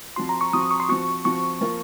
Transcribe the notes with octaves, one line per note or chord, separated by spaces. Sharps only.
F3 C4 F#4 C6
A#5
C#6
F3 C4 F#4 D#6
C#6
C6
F3 C4 F#4 C#6
F3 C4 F#4 C#6
F3 A#3 F4